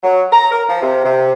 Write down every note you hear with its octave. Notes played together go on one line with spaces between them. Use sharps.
F#3
A#5
A#4
F3
C3
C3